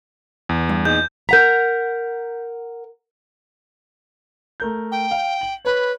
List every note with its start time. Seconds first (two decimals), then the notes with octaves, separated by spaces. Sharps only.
0.49 E2
0.69 G2
0.85 A#2 D#4 G#4 G6
1.29 A#4 F#5 A#5 G6 B6
4.60 A3 A#4 G6
4.91 G5
5.11 F5
5.41 F#7
5.65 B4 C#5 B5